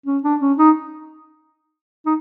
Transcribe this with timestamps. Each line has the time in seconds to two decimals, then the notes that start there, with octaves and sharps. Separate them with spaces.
0.06 C#4
0.23 D4
0.40 C#4
0.57 D#4
2.06 D#4